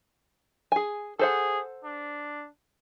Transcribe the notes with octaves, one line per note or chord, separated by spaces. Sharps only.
G#4 G#5
G#4 A4 C5 F#5
D4